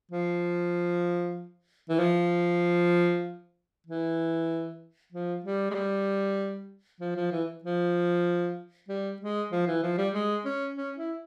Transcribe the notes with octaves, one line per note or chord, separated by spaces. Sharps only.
F3
E3
F3
E3
F3
G3
G#3
G3
F3
F3
E3
F3
G3
G#3
F3
E3
F3
G3
G#3
C#4
C#4
E4